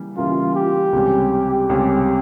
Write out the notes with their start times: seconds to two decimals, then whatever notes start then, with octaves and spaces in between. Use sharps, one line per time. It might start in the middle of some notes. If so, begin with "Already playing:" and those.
Already playing: C#3 E3 G3 A#3
0.17 C#3 E3 G3 A#3 E4 F4
0.55 G4
0.93 C#2 C3 G3 C#4
1.69 C#2 C3 G3 C#4